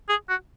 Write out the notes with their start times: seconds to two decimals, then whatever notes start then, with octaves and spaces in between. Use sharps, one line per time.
0.09 G#4
0.29 F#4